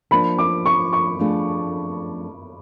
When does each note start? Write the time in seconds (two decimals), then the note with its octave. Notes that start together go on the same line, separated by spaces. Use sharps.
0.11 F3 A#3 D4 B5
0.38 D6
0.66 C#6
0.93 C#6
1.19 F3 A3 D4 F4 G#4